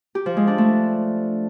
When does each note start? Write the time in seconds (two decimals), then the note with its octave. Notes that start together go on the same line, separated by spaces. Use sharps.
0.15 G4
0.26 F3
0.37 G#3
0.47 D4
0.58 A3